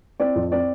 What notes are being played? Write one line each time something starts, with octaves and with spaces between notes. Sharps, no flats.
C4 D5
F2
C4 D5